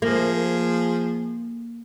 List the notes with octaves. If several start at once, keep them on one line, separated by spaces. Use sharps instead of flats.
F3 A#3 G#4